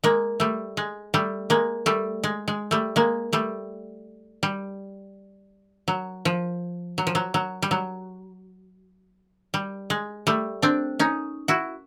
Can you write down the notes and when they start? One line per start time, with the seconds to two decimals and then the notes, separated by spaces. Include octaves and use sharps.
0.04 G#3 A#3
0.40 G3 A3
0.77 G#3
1.14 G3 A3
1.50 G#3 A#3
1.86 G3 A3
2.24 G#3
2.48 G#3
2.71 G3 A3
2.96 G#3 A#3
3.33 G3 A3
4.43 G3
5.88 F#3
6.25 F3
6.98 F#3
7.07 F3
7.15 F#3
7.34 F#3
7.62 G3
7.71 F#3
9.54 G3
9.90 G#3
10.27 G3 A3
10.62 C4 D4
10.99 C#4 D#4
11.48 E4 F#4